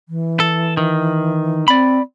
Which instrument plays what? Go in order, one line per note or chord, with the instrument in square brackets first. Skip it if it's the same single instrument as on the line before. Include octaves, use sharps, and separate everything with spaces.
[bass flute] E3
[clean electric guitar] A4
D#3
[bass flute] C4 [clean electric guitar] D5 B5